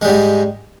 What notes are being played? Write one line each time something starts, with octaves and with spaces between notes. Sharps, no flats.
G#2 G3 G#3